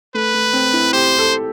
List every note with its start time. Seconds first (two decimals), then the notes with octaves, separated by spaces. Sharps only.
0.14 A3 B4
0.34 A3
0.53 C4
0.73 E4
0.93 G4 C5
1.18 A4